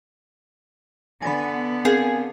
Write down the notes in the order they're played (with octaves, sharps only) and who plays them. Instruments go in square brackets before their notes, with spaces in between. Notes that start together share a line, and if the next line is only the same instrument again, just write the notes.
[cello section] D3 B3 [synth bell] G#5 B5
[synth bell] C4 A#4 F5 [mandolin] G#4